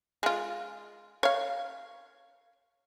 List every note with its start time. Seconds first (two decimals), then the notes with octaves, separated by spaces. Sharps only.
0.23 G#3 F4
1.23 C#5 F5